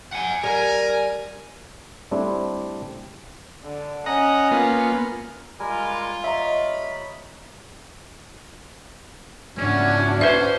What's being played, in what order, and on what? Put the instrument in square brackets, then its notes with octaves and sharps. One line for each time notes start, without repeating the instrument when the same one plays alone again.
[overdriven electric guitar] F#5 G#5
[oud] G3 [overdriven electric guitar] A#4 [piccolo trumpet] G#5
[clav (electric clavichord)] G3 A3 C4 D4 E4
[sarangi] D3
[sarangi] C#4 [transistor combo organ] D#5 F#5 A#5
[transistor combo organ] A#3 B3 F4
[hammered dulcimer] G3 [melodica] G#3 A#4 G#5 [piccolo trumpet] F4
[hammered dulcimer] C#5 D#5 [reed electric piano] E5 A#5 [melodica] B5
[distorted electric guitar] C#2 G#2 [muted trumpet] C#4 [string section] D4 E4 F#4
[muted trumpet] C#4 [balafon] B4 E5 [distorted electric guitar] C5